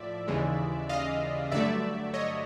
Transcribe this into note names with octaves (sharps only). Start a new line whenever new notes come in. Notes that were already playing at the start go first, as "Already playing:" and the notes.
Already playing: A2 F3 D5 E5
D#2 C#3 E3 G#3
D#5 F5
G2 D3 F#3 A3 D5 E5
C#5 D#5